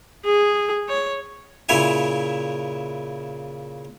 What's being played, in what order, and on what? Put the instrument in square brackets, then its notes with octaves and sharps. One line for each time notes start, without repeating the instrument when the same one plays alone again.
[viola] G#4
C#5
[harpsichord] A#2 C#3 E4 C#5 E5 G#5